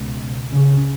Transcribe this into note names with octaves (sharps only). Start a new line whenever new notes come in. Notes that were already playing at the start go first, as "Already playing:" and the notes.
Already playing: C#2 B2
C#3